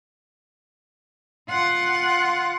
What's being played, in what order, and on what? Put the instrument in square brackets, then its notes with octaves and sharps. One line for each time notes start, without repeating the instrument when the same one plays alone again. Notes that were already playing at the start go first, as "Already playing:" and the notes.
[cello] F4 F#5